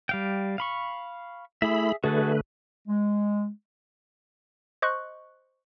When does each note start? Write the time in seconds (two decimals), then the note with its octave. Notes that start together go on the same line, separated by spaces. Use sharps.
0.09 G3 F5 G5
0.58 F5 B5 C#6
1.62 A3 E4 G#4 E5 B5
2.04 D3 A3 F#4 G#4 A4 B4
2.88 G#3
4.82 C5 D#5 C#6 F#6